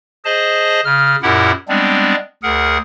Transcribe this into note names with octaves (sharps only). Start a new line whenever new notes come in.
G#4 C5 D#5 A5
C#3 F6
F#2 A#2 E4 G4 A#4 F#5
G3 G#3 B3 C4 D4
D2 G#4 A#4 F#5